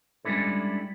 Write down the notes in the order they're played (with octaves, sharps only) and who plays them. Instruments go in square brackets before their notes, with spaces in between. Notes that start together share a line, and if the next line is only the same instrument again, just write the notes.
[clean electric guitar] G3 G#3 C#4 D4 E4 A4